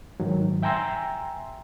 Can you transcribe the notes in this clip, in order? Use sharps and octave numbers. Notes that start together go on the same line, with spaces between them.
G#2 D#3 F#3
E5 G5 G#5 A#5 C6 E6